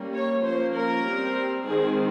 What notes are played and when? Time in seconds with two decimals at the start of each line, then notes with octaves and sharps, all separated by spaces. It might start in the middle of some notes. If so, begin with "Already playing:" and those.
Already playing: G3 A#3 C#4
0.13 C#5
0.44 F3 A#3 C#4 C5
0.74 A#4
1.05 G3 C4
1.67 D#3 G#3 C4 G#4